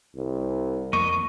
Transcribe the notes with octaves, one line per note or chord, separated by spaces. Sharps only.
C2
F2 A#3 D#5 C#6